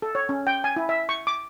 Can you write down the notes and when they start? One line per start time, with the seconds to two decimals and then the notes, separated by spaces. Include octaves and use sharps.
0.02 A4
0.15 C#5
0.29 C#4
0.47 G5
0.64 G#5
0.76 E4
0.89 E5
1.09 C#6
1.27 D6